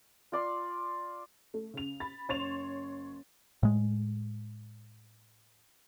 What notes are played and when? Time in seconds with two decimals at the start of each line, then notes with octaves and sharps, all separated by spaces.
0.32 F4 D5 C6
1.54 A3
1.74 C#3 F7
2.00 B5 A6
2.29 F#1 C#5 C6 A6 E7 F7
3.63 A2 G#3